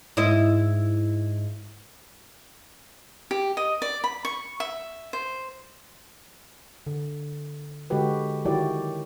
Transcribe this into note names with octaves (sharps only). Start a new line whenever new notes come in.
G#2 E4 D#5
G4
D#5
D5
B5
C#6
E5
C5
D3
D3 G#3 F#4 G4 B4
D#3 F#3 E4 F#4 G4 D5